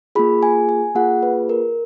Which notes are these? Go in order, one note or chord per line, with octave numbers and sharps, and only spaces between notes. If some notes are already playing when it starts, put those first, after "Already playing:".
A#3 F4 G#4 B5
G#5
G#5
A#3 F4 G#4 F#5
B4
A#4